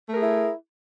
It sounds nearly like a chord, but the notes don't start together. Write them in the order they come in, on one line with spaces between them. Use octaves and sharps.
A3 A#4 G#4 E4